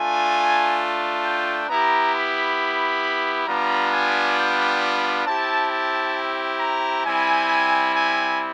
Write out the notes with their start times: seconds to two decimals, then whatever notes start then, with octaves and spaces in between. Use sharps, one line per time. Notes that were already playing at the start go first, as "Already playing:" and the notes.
Already playing: A3 D4 F4 G#5
1.24 G5
1.68 B3 E4 G4 A#5
2.12 B5
3.46 G3 B3 D4 F4 A#5
3.92 G#5
4.36 G5
5.25 C4 E4 G4 A5
5.70 A5
6.59 A#5
7.04 G3 C4 E4 G#5
7.94 G#5